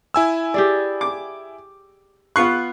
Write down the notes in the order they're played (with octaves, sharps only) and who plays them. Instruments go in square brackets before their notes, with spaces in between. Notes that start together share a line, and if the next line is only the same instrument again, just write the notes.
[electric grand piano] E4 G#5 E6
[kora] G4 G#4 D5
[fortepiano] D6
[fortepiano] B3 F4 C#6 [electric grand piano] F#6 C7